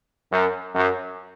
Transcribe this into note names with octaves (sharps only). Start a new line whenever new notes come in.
F#2
F#2